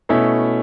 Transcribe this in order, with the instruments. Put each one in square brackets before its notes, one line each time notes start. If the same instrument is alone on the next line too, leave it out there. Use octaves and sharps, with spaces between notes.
[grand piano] B2 A3 C#4 E4